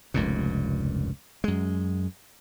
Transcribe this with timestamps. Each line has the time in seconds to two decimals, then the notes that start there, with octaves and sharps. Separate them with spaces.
0.14 F1 C#2 G2 A#2
1.44 F#2 G#3